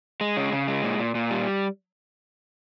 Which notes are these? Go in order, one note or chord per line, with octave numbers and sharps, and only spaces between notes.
G#3
C#3
C#3
G#3
A#2
A#2
A#2
G3